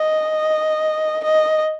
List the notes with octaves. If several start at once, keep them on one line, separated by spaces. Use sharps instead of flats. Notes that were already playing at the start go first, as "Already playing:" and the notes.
Already playing: D#5
D#5